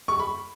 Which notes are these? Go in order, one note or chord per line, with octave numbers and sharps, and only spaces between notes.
C#6
B5